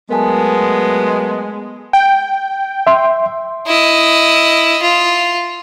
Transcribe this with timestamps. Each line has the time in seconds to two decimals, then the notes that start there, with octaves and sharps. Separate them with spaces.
0.10 F#3 G#3 A3 B3 A#4 G#5 A5
1.93 G5
2.87 E5 C6
3.67 E4 D#5
4.82 F4